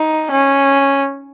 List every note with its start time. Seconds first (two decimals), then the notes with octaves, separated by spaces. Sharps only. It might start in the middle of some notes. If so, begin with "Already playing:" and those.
Already playing: D#4
0.31 C#4